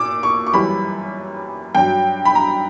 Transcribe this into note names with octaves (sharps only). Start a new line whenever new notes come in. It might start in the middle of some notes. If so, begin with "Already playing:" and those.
Already playing: A#2 D6 E6
C#6
C#6
F#2 E3 G3 B5
G2 F#3 G5
B5
A#5